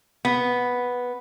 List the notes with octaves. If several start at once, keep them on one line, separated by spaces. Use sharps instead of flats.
B3